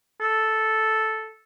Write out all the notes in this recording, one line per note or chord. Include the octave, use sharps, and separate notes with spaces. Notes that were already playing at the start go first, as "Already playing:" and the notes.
A4